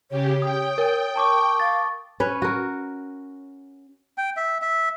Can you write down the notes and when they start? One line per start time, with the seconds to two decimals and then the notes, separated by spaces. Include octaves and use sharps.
0.10 C#3 G4 C#5
0.42 G5 D#6
0.78 A#4
1.16 A5 C#6 D6
1.60 F5 A6
2.20 C#4 B4 C#5
2.42 F#4 A#4
4.18 G5
4.37 E5
4.62 E5